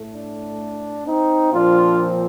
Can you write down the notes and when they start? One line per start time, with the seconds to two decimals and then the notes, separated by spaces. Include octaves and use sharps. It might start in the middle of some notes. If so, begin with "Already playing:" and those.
Already playing: A2 A3
0.13 D4
1.07 C4 D#4
1.53 A#2 F3 C4 D4 F4